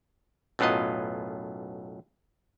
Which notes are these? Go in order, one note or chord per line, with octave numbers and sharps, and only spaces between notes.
B1 F#2 A2 B3 F4 D#5